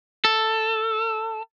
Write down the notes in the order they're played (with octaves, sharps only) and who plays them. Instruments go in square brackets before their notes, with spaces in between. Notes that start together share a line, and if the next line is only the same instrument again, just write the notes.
[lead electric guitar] A4